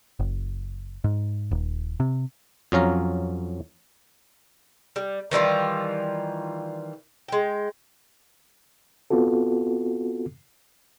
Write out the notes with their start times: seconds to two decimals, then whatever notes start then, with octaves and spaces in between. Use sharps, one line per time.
0.19 F#1
1.04 G#2
1.51 D#1
2.00 C3
2.72 F2 F#3 C#4 F5 A#5
4.96 G3
5.31 D#3 E3 G3 F4
7.28 G#3 G5
9.10 B3 C4 F4 F#4 A4